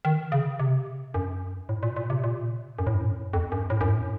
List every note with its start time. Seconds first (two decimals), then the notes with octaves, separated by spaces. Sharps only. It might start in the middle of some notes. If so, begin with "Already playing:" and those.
0.05 D#3
0.32 C#3
0.59 C3
1.14 F#2
1.69 A2
1.83 A#2
1.96 A#2
2.10 C3
2.24 A#2
2.79 F#2
2.87 A2
2.95 F#2
3.03 A2
3.10 F#2
3.33 F2
3.52 F#2
3.70 A2
3.81 F#2
3.88 A2